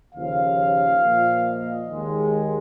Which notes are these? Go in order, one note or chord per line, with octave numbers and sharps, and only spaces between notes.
D#2 C#3 F3 F5
A#2 F3 A#3
D#5
D#2 D#3 G#3